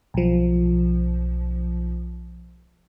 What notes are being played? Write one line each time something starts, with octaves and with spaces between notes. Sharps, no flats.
B1 F3